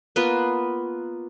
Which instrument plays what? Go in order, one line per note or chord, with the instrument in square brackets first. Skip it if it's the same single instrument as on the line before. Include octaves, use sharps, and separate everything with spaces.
[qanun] A#3 B3 F4 B4